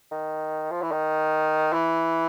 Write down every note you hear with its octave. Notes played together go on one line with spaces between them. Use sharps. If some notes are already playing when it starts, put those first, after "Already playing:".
D#3
F3
E3
D#3
E3